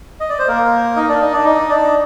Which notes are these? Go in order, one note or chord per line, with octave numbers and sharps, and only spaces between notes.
D#5
D5
C5
A#3 A#4
D#4 D#5
D4 D5
D#4 D#5
D4 D5
D#4 D#5
D4 D5